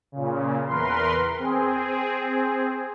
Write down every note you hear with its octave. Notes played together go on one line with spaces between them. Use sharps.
A#2 C#3
E2 A#4 B4 C6
C4 G#4